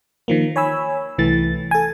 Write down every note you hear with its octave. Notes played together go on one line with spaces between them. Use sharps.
D#3 F3 A#3
C#5 G#5 B5 E6
C2 E3 A3 A6
A4 G#5